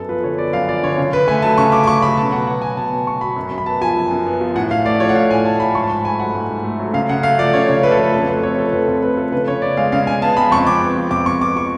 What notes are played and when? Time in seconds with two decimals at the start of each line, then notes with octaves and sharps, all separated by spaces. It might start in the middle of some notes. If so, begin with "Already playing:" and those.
Already playing: F#2 B3 A4
0.09 F3 B4
0.24 D3 C#5
0.38 B3 D5
0.53 F#2 F5
0.68 F3 D5
0.83 D3 C#5
0.98 C#3
1.12 C#3 B4
1.27 A3 G#5
1.42 F#3 A5
1.58 C#3 C#6
1.72 C#3 D6
1.84 D6
1.87 A3 C#6
2.02 F#3 B5
2.17 B2 A5
2.32 B2 F#5
2.47 B3 F#5
2.62 F#3 G#5
2.76 B2 A5
2.91 B2
3.07 B3 C#6
3.21 F#3 B5
3.36 F#2
3.51 F#2
3.58 B5
3.66 B3 A5
3.82 F3 G#5
3.97 F#2
4.11 F#2
4.26 B3
4.41 F3
4.55 A2 F#5
4.71 A2 F5
4.85 A3 D5
5.00 F3 C#5
5.09 F#5
5.15 A2 F5
5.31 A2 G#5
5.45 A3 A5
5.60 F3 B5
5.74 G#2 C#6
5.83 A5
5.90 G#2 B5
6.05 A3 G#5
6.20 F#3 F#5
6.34 G#2
6.50 G#2
6.64 A3
6.79 F#3
6.94 C#3 F5
7.09 C#3 F#5
7.23 A3 F5
7.39 F3 D5
7.53 C#3 C#5
7.68 C#3 C#5
7.83 A3 B4
7.91 A4
7.98 F3 B4
8.13 F2 A4
8.28 F2 B4
8.43 A3 C#5
8.58 F3 A4
8.73 F2 B4
8.88 F2 A4
9.02 A3 B4
9.17 F3 A4
9.32 C#3 B4
9.47 C#3 C#5
9.62 B3 D5
9.77 G#3 F5
9.92 C#3 F5
10.07 C#3 G#5
10.22 B3 A5
10.37 G#3 B5
10.51 F2 C#6
10.67 F2 D6
10.82 B3
10.96 F3
11.11 F2 D6
11.26 F2 C#6
11.41 B3 D6
11.56 F3 C#6